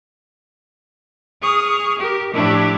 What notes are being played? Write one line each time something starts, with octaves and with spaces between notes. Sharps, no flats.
G#4 C#6 D#6 F6
G4 A#4
A2 F3 A3 D4 E4 G4